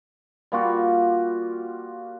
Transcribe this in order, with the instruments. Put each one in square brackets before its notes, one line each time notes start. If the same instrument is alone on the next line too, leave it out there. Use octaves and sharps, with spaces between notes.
[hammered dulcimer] G3 A#3 F4 F#4